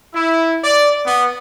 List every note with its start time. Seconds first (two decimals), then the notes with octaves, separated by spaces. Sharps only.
0.14 E4
0.63 D5
1.04 B3